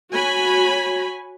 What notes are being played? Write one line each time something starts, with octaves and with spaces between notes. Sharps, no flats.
F#4 C#5 G#5 B5